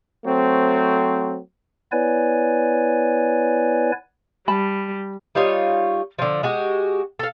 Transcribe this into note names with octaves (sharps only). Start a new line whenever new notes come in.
F#3 A3 C4
B3 E4 B4 C#5 D5 G#5
G3 A5 B5
G3 D#4 F4 C#5
D3 F3
G#3 F#4 G4
A4 F5